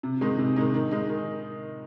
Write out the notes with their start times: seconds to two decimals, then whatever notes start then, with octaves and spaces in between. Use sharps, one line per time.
0.03 C3
0.21 D#3 G#3 D#4
0.39 C3
0.56 D#3 G#3 D#4
0.74 D#3
0.91 G#3 D#4
1.09 D#3